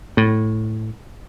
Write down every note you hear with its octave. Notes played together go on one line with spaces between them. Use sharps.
A2